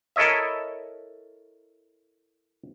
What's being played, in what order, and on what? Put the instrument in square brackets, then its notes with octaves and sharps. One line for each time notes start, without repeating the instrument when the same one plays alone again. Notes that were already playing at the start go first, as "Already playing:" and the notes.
[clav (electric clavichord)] E4 A4 A#4 C#5 D#5 E5